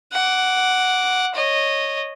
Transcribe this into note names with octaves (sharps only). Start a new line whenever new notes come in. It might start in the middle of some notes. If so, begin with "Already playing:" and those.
F#5 D6
C#5 D#5